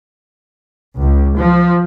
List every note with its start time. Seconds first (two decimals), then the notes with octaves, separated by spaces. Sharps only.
0.99 C#2
1.37 F3